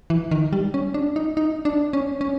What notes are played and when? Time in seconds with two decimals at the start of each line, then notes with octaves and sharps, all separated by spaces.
0.10 E3
0.31 D#3
0.53 G3
0.74 C#4
0.94 D4
1.16 D#4
1.37 D#4
1.65 D4
1.93 C#4
2.21 C#4